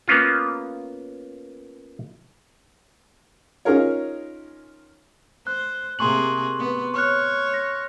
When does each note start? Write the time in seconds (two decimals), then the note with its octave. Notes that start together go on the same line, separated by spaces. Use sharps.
0.08 A#3 B3 C#4 F4
3.65 C#4 D#4 F4 G#4 A#4 C#5
5.47 C5 F#6
5.99 C3 A#3 G#4 C6 C#6 F#7
6.59 B3
6.94 C#5 C#6 F6 F#6
7.54 A#6